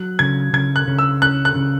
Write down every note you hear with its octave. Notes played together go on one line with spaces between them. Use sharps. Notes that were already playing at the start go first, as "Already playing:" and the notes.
Already playing: F#3 F#6
C#3 G#6
C#3 G#6
F#6
C#3
E6
C#4 F#6
F#6
C#3